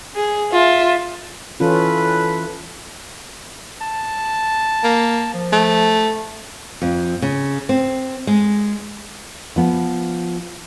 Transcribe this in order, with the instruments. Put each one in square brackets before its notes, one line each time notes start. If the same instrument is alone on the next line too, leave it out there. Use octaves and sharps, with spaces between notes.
[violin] G#4
F4 E5
[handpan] E3 C#4 F4 [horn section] A4 B4
[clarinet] A5
[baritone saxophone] A#3
[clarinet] F3
[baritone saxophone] A3
[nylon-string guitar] F2
C#3
C4
G#3
F3 B3